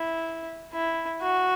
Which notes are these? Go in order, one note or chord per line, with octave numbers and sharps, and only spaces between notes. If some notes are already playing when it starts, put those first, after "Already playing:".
Already playing: E4
E4
F#4